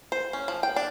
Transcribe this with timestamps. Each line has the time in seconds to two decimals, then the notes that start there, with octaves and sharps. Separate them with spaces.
0.12 C5
0.33 C#4
0.48 F3
0.63 G5
0.76 D4